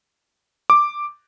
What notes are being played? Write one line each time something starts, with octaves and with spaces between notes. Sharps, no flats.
D6